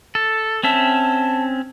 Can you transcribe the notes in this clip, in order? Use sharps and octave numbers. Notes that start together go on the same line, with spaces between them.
A4
C4 C#4 E5 A5